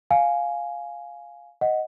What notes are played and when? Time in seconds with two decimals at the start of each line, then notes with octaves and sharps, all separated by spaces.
0.11 F5 G#5
1.61 D#5 F#5